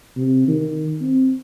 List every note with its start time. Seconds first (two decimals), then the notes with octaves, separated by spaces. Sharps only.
0.17 C3
0.48 D#3
1.02 C4